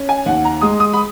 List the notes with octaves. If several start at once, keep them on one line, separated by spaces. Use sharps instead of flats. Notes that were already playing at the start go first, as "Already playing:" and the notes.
Already playing: C#4
G#5
D#2 F#5
A#5
G#3 D#6
D#6
B5